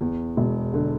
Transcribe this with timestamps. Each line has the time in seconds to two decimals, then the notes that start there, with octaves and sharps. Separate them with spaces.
0.01 E2
0.37 E1
0.74 D3